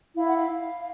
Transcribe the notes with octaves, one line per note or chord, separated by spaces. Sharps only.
E4 F5
F#5
F5